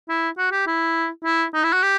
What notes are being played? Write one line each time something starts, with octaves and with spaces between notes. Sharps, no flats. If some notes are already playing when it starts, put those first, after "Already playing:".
E4
F#4
G4
E4
E4
D#4
E4
F#4
G4